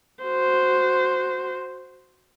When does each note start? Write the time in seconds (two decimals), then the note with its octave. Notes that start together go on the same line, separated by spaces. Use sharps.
0.24 F#4 C5